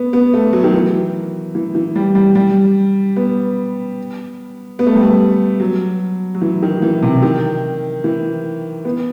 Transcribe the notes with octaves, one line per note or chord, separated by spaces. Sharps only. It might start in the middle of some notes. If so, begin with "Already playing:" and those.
Already playing: B3
B3
A3
F#3
D#3
E3
E3
E3
G3
G3
G3
B3
B3
A3
G3
A3
F#3
F#3
E3
D#3
E3
C3
D#3
E3
B3